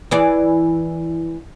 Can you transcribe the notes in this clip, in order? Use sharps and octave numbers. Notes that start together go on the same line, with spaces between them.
E3 G#4 D5